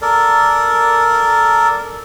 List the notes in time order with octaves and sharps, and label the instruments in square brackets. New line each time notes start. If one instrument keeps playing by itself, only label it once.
[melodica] A4 A#4 D5